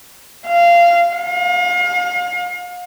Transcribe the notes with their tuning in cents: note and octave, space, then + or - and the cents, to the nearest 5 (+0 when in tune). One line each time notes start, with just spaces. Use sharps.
F5 -20
F5 +40